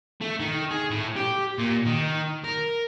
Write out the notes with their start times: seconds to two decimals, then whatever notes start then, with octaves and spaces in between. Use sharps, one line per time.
0.21 A3
0.40 D#3
0.71 G#4
0.90 A2
1.17 G4
1.58 A#2
1.86 D#3
2.44 A#4